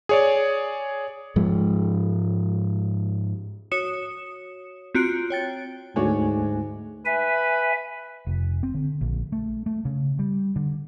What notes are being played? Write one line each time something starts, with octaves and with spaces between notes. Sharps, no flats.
G#4 C#5 D5
G#2 F3 G#3
F#4 C#5 D#6 C#7 E7
C4 F4 F#4 A#5 F#6 D7
C#5 G5 A6
D2 G#2 A3 D4 F#4 C#5 G#5
B4 E5 G#5
F1
C4
D3
A#1
A3
A3
C#3
G3
D3